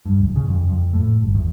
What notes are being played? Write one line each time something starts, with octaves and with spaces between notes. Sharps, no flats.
G2
D1
C#3
F2
F2
A2
G1
E2